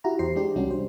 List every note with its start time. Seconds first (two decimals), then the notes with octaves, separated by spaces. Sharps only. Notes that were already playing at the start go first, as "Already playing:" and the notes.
0.04 E4 F#4 G4 A#5
0.19 E2 G4 C5 C7
0.36 G#3 D4 G4
0.55 C2 G3 C#4 D4 F#4
0.71 C5